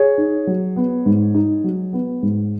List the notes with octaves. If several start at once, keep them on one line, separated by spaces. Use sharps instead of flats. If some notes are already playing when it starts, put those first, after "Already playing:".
Already playing: G#4 C#5
D#4
F#3
B3
G#2
D#4
F#3
B3
G#2